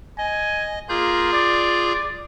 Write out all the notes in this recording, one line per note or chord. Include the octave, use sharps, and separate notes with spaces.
D#5 G#5
A#3 F4 G#4 G6
D5